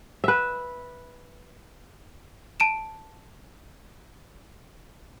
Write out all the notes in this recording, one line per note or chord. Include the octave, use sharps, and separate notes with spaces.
B4 E5
A5 D7 E7